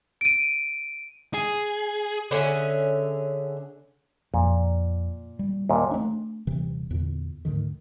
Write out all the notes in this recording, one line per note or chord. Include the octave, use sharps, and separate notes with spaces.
D7 D#7
G#4
D3 C#4 G#4 E5
F2 A#2
G3
D#2 A#2
A3 A#3 C4 D4
D#1 C3 E3
E2 A#2 D3
D2 G#2 D3 D#3